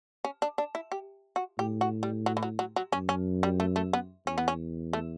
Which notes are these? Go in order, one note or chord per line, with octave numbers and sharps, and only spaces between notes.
C#4
D4
D4
E4
G4
F#4
A2 G4
F#4
G3
F#3
E3
F#3
F#3
F#3
F#2 C#4
C#4
G3
A3
A3
B3
E2 C#4
B3
C#4
A3